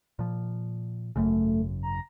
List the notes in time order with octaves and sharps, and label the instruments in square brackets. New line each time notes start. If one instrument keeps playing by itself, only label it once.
[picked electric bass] A#2 F3
[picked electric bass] G#1 F#2 C#3 [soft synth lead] A3
[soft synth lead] A#5